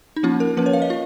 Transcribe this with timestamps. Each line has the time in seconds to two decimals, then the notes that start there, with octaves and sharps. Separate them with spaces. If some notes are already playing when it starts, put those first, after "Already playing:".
0.16 D#4
0.23 F3 A#3 C#4 F4
0.40 A#4
0.57 F3 A#3 C#4 B4
0.66 C#5
0.73 F5
0.82 D#5
0.90 F4